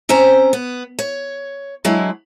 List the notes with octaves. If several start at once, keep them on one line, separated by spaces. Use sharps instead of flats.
C4 C#4 C5 G5 A#5
B3
C#5
D3 F#3 G#3 E4